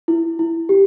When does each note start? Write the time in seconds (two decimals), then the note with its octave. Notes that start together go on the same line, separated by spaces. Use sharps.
0.08 E4
0.39 E4
0.69 G4